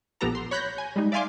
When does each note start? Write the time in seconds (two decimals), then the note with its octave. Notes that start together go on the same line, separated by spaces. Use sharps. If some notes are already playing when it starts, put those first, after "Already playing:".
0.21 A#1 B3 G4 A4 A#5
0.35 C6
0.51 C#5 B5 F#6 G6 A#6
0.78 G#5
0.96 G3 G#3 D#4
1.12 D5 E5 F5 G#5 C6 D6